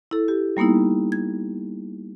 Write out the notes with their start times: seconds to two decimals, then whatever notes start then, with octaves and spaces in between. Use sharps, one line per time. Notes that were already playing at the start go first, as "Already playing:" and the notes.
0.11 E4 A4
0.28 G4
0.57 G3 A#3 B3 D#4 E4
1.12 G#6